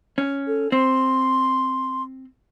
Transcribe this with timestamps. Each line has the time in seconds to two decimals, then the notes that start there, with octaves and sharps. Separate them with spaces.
0.18 C#4
0.48 A4
0.72 C4 C6